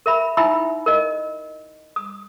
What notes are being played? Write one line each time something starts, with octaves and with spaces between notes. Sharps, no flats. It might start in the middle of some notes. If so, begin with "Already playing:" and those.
A#4 E5 B5
D#4 E4 E5 G5 B5 E6
A#4 D#5
D#6